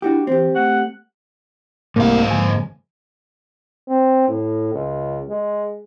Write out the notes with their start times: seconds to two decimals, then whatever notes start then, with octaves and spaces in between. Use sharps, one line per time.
0.02 D4 E4 F#4 G4
0.27 E3 C4 G4
0.55 A3 F#5
1.96 C2 G#2 A3 A#3 F5
2.31 D3 F3 A#3 G#5
3.88 C4
4.28 A2
4.74 C#2
5.29 G#3